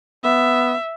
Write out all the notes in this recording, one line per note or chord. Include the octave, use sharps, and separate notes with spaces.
B3 E5